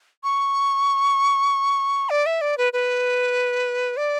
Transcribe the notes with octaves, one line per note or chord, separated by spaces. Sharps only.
C#6
D5
E5
D5
B4
B4
D5